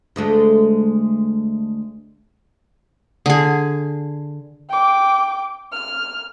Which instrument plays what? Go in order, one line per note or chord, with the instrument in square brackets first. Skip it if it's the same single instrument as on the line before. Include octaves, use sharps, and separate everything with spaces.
[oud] D2 G#3 A3
[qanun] D3 G#4
[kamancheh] G5 D6
F6